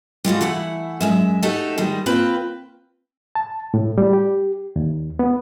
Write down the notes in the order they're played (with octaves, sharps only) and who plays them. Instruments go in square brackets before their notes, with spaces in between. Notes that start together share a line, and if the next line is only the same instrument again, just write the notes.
[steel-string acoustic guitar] G3 G#3 F4 F#4
E3 A3 E4 F#5
F#2 G#3 E5
A3 D#4 F#4 G4 A4
D#3 G3 G#3
A#3 C4 F4 B4 G5
[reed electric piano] A5
A2
G3
G4
D#2
B3